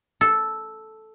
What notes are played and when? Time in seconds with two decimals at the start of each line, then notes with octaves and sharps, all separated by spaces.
0.21 A4